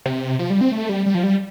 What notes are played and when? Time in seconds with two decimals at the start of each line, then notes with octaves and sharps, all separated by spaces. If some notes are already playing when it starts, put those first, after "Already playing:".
0.06 C3
0.39 F3
0.50 G3
0.61 C4
0.72 A3
0.89 G3
1.06 G3
1.15 F3
1.23 G3